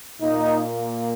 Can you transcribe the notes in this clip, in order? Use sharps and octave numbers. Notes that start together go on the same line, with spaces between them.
A#2 A#3 D#4